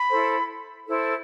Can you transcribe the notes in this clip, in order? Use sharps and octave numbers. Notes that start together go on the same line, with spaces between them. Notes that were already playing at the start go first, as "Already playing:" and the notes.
Already playing: B5
E4 A4 C5
E4 A4 C5